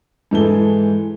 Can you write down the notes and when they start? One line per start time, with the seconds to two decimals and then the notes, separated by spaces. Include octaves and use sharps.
0.31 G#2 E3 A4 G7